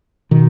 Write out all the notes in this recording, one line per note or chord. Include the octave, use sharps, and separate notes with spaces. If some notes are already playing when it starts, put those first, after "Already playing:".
B2 D#3